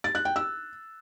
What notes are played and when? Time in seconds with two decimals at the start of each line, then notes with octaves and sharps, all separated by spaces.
0.04 A6
0.15 F#6
0.25 G5
0.36 E6